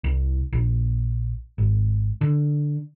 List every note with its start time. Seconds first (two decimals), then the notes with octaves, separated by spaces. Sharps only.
0.04 C2
0.53 A#1
1.58 G#1
2.21 D3